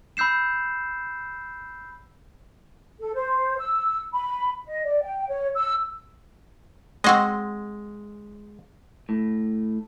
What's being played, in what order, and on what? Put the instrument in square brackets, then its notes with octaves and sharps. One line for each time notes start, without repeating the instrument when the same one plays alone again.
[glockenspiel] B5 E6 G6 C7 E7
[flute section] A4
C5
E6
B5
D#5
D5
G5
C#5
E6
[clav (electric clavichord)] G#3 [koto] C4 F#4 D#5
[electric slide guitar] A2